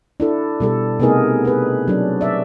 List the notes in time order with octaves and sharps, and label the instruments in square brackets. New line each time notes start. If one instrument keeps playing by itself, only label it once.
[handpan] D4 E4 A4
B2 G3 A4
C3 A3 B3 D#4 G#4 A#4
G#4 B4
F#3 D4
D5 E5